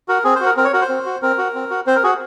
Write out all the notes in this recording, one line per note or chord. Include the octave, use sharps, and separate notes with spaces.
F#4 A#4
C4 G#4
C5
F#4
A#4
C4 A#4
C#5
F#4 A#4
C5
C4
F#4
C4 A#4
F#4
C4
F#4
C4 C5
A#4
F#4 G#4